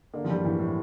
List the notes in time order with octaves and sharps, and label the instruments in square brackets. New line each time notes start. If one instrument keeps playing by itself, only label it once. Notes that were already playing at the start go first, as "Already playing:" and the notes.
[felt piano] D3 [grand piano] A#3
[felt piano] F3
[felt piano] E3 [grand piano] G3
[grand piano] A2 [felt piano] E3
[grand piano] A2